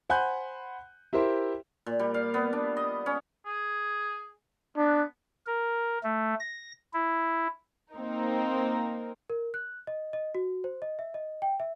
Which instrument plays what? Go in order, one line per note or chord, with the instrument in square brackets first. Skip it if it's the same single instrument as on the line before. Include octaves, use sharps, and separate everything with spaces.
[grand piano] C5 F#5 G#5 B5 F#6 G6
E4 G4 A#4 C5 E5
[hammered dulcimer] A#2
G3
F5
B3
D4
D#5
C#4
[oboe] G#4
[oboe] B3 [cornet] D4
[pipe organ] A#4
A3
A#6
E4
[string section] A#3 C4 D#4 A#4
[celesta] A#4
F#6
D#5
D#5
F#4
C5
D#5
E5
D#5
G5
E5